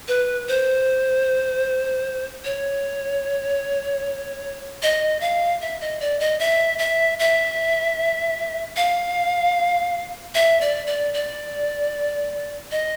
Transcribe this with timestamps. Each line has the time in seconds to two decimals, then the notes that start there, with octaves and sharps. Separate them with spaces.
0.08 B4
0.48 C5
2.45 C#5
4.82 D#5
5.21 F5
5.61 E5
5.81 D#5
6.00 D5
6.20 D#5
6.39 E5
6.79 E5
7.19 E5
8.76 F5
10.35 E5
10.61 D5
10.87 D5
11.14 D5
12.71 D#5